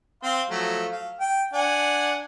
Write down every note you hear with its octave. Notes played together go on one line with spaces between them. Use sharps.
C4 F5 C6
F3 F#3 A3
F5
G5
D4 F#5 G#5